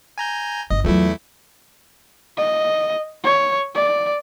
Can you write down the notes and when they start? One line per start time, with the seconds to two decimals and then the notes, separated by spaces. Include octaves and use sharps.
0.18 G#5 A#5 G6
0.70 G1 D#5
0.84 E2 F#3 A3 E4 F4
2.37 D#5
3.24 C#5
3.75 D5